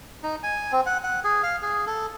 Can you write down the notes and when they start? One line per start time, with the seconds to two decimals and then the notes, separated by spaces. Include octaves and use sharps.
0.23 D#4
0.43 G#5
0.72 C4
0.86 F#5
1.03 F#5
1.24 G#4
1.43 F5
1.62 G#4
1.87 A4